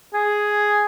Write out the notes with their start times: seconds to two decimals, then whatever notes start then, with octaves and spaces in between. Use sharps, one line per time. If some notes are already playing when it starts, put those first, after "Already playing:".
0.14 G#4